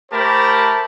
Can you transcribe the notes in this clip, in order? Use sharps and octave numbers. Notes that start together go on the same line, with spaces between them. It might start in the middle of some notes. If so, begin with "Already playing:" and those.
A3 G4 A#4 C5 A5 B5